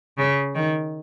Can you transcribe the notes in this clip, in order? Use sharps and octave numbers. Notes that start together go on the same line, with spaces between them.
C#3
D#3